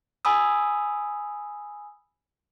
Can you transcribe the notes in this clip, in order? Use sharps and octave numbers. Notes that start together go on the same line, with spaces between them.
G#5 B5 D#6 E6